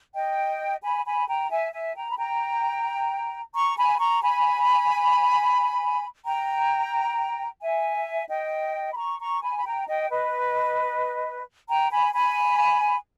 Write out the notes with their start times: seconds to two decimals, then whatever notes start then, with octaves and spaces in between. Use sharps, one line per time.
0.15 D#5 G5
0.82 G#5 B5
1.05 G#5 B5
1.28 G5 A#5
1.50 E5 G#5
1.73 E5 G#5
1.95 G5 A#5
2.09 B5
2.18 G5 A#5
3.54 A#5 C#6
3.77 G#5 B5
3.99 A#5 C#6
4.22 G#5 B5
6.26 G5 A#5
7.61 E5 G#5
8.29 D#5 G5
8.92 B5
8.97 A#5 C#6
9.20 A#5 C#6
9.42 G#5 B5
9.57 B5
9.65 G5 A#5
9.88 D#5 G5
10.10 B4 D#5
11.69 G5 A#5
11.91 G#5 B5
12.14 G#5 B5